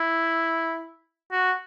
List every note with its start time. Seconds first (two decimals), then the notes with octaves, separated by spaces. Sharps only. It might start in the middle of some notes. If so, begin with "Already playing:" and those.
Already playing: E4
1.32 F#4